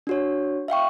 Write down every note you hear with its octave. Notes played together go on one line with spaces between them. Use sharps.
D4 F#4 C#5
E5 F5 G5 C#6